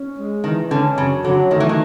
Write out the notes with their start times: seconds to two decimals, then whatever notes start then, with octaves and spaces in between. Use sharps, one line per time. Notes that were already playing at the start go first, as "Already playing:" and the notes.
Already playing: C#4
0.18 G#3
0.44 D#3 E3
0.71 D3 C#4
0.98 F#2 C#3
1.24 D3 F#3
1.51 D#3 A3
1.60 E3
1.69 D#3